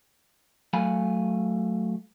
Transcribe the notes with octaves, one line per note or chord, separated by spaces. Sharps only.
F#3 A3 F5 G#5 B5